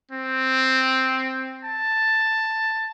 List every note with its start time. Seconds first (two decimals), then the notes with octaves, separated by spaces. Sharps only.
0.12 C4
1.65 A5